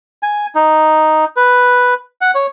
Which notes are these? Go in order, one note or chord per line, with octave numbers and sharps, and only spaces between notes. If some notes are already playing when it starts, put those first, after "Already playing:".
G#5
D#4
B4
F#5
C#5